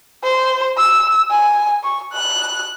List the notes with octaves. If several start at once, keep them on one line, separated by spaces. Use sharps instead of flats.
C5
E6
G#5
C#6
F#6